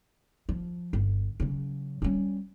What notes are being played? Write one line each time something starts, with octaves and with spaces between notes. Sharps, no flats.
F3
G1
C#3 F#3
G3 C#4